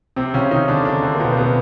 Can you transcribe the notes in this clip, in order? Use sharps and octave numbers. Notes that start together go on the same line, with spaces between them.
C3 C4
C#3 C#4
D#3 D#4
D3 D4
D3 D4
C3 C4
A#3
B2 B3
C4
B2 B3